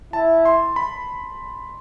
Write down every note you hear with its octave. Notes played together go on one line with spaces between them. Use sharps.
E4 A5
C6
B5